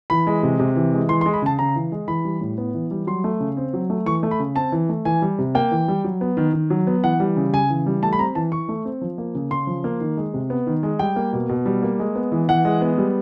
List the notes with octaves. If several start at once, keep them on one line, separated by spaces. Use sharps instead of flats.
E3 B5
G#3
C3
C3
E3
G#3
E3 C6
C6
G#3
B5
C#3 A5
C#3 A#5
E3
G#3
E3 B5
G3
A2
B3
E3
G3
F#3 C6
A3
C#3
C4
F#3
A3
E3 C#6
A3
B5
C#3
C4 A5
E3
A3
E3 G#5
G3
C3
A#3 G5
E3
G3
F#3
B3
D#3
D#3
F#3
B3
E3 F#5
G3
C#3
C#3 G#5
E3
G3
A3 A5
B5
C4 A#5
E3 A5
E3 C#6
A3
C4
F3
A#3
C#3
C#3 C6
F3
A#3
D#3
G#3
C3
B3
D#3
G#3
G3 G5
A#3
B2
B2
G3
A#3
G#3
B3
E3
E3 F#5
G#3
B3
G3